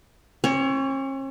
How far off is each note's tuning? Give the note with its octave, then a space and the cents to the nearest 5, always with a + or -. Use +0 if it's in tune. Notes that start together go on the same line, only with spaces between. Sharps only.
C#4 -45 C#5 +25